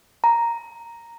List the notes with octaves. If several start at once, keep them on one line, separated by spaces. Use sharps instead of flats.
A#5